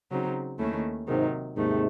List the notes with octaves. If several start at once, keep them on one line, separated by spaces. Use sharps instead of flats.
C#3 F#3 C4 D#4
D#2 D#3 A3 C#4 E4
G#2 C3 D#3 F#3
D#2 G#2 C3 D#3 A3